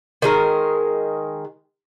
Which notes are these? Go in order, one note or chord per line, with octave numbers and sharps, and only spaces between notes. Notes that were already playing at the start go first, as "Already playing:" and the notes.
D#3 G#3 A#4